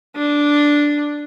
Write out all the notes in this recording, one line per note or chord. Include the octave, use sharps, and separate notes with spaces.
D4